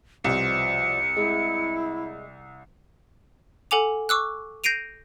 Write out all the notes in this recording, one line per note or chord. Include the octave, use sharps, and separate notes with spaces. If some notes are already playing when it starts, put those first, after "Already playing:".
C2 B2 F3 G3 C#7
G#3 E4
A4 F#5 G#5 D6 F7
C#6 D6 E6 F#6
G6 A#6 C7 D7 D#7 F7